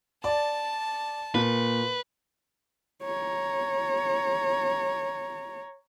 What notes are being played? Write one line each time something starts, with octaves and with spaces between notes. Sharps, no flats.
D5 A5
A#2 B4
C#5 A#5